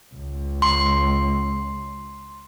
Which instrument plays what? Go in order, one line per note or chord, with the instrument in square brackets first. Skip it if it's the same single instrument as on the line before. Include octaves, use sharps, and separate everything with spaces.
[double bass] C#2
[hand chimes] C6